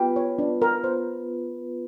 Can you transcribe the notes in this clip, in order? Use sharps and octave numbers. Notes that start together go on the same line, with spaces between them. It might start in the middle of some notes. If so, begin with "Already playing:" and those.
Already playing: B3 F4 G4 B4
C#5
D4
A#4
C5